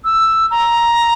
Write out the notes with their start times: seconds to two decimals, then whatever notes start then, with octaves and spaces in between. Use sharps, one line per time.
0.05 E6
0.51 A#5